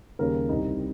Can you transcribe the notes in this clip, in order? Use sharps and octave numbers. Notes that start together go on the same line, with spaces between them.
D#2 C#3 G3 C#4 A#4
C2 C3 G3 C4 D#4